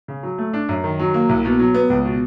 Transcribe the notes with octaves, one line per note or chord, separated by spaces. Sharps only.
C#3
F#3
A3
D4
F#2
D#3
F#3
A#3
C2
B2
F#3
B3
C#2
B2